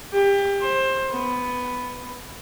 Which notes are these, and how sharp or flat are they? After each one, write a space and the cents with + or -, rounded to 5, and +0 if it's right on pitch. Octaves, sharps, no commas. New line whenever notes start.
G4 +25
C5 +20
B3 +10